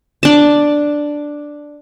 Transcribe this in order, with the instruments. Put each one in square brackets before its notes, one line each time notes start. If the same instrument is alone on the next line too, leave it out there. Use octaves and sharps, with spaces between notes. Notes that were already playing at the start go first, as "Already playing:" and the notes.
[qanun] D4 A5